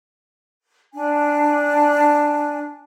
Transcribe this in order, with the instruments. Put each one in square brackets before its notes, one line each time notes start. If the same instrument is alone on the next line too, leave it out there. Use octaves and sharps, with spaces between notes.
[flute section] D4 G#5